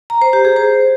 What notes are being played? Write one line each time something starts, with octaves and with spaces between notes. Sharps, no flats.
A#5
C5
G4
G#4
C5